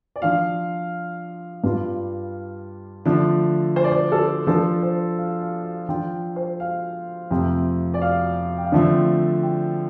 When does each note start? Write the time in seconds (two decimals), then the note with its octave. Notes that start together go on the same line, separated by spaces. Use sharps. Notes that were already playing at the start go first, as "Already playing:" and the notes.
0.16 D5
0.22 F3 D4 F4 F5
1.64 G2 G3 F4 F5
3.05 D3 F3 A3 D4
3.76 C5
3.84 D5
3.92 C5
4.12 A4
4.47 F3 D4 F4 A4
4.83 C5
5.18 F5
5.42 F5
5.65 F5
5.89 F3 D4 F4 G5
6.36 C5
6.60 F5
7.31 F2 C3 A3 C4
7.94 D5
8.02 F5
8.58 G5
8.65 F5
8.72 D3 F3 A3 C4 D5
9.43 G5